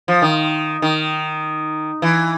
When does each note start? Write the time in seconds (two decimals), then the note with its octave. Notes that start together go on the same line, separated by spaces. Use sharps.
0.08 F3
0.22 D#3
0.82 D#3
2.02 E3